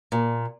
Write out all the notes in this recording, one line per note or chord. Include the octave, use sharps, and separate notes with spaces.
A#2